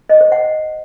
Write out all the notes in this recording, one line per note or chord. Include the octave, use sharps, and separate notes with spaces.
D#5
C5
F#5